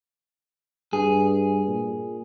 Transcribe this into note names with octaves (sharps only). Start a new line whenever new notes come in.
G2 G#4
A#2